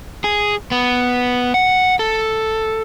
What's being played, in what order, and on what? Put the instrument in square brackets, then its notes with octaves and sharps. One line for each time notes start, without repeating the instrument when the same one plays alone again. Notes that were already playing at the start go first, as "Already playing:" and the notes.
[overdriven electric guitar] G#4
B3
F#5
A4